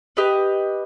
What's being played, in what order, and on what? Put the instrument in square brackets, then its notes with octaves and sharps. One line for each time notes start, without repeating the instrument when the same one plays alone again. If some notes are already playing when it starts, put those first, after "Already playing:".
[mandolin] G4 B4 D#5